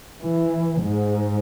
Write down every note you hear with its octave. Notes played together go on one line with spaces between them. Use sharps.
E3
G#2